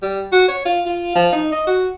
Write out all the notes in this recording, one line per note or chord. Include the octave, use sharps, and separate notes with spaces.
G3
F#4
C#5
F4
F4
F3
D#4
D#5
F#4